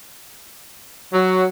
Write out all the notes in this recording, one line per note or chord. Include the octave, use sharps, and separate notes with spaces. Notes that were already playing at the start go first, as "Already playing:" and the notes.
F#3